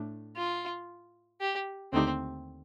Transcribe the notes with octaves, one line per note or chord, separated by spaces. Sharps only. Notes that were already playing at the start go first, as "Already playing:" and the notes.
Already playing: A2 A3 D4
F4
G4
D#2 D3 A3 C4 D#4 G4